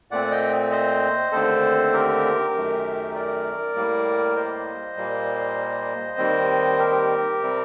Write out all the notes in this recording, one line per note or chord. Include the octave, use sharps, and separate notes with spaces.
A#2 A3 C4 D5 F#5
D#5 G5
C5 D#5
D#2 D3 A3 C4 A4 C5
G4 A#4
F#2 D#3 A3
A#4 D5
A2 G3 A#3
C5 D#5
A#2 G3 A#3
D#2 D#3 G3 C4
G4 A#4
C3 G3 C4